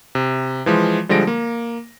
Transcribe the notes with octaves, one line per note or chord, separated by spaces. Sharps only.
C3
E3 F3 G#3
D3 F3 G3 G#3 A#6 D7
A#3